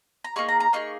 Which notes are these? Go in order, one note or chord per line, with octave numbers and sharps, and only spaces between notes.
A#5
A#3 D#4 G#4 C#6
A#5
A#5
A#3 D#4 G#4 C#6